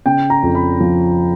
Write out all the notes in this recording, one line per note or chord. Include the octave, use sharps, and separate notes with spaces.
C#3 G5
A#5
F2
B5
F3